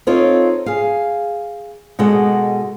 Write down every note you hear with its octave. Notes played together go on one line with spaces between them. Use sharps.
C4 D#4 F4 A4 C#5
G#4 F5
B2 G#3 A4 F#5